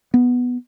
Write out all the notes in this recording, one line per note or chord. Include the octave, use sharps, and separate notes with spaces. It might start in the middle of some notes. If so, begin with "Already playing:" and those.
B3